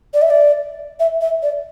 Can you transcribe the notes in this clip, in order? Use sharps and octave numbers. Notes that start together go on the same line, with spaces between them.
D5
E5
D5
E5
E5
D5